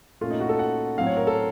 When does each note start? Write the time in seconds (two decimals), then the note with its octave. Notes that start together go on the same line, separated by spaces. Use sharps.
0.21 A#2 A3 C#4 F4
0.30 D#4
0.41 F#4
0.49 A4
0.59 F#5
0.97 A2 F#3 C4 F5
1.07 C#5
1.17 A#4
1.27 A4